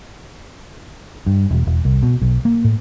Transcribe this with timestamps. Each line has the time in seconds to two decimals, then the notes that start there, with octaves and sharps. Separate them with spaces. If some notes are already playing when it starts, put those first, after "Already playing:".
1.26 G2
1.51 E1
1.67 E1
1.85 C2
2.03 B2
2.21 B1
2.45 A#3
2.64 A2